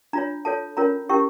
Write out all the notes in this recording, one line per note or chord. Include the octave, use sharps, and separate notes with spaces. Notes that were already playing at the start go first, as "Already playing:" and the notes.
D4 F4 C#5 A#5
F4 A4 C#5 A5
C#4 F4 A#4 C#5 A#5
C#4 E4 G4 A#4 C#6